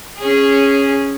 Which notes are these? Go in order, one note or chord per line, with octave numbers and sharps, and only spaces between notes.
C#4 G#4